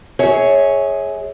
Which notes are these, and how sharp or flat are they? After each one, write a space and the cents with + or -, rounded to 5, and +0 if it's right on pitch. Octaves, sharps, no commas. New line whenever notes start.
G#4 +0 C#5 +0 E5 -30